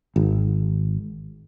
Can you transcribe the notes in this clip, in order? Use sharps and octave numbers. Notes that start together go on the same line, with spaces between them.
G#1